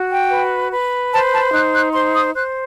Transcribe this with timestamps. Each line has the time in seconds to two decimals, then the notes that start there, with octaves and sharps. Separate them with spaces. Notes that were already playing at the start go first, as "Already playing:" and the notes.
Already playing: F#4
0.11 G5
0.31 B4
0.72 B4
1.12 C5 A5
1.33 A5
1.54 D#4 F#6
1.74 F#6
1.94 C5 C6
2.15 D#6
2.36 C5 F#6